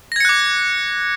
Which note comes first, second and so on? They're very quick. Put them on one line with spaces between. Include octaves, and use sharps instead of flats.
A#6 G#6 C#7 F#6 D6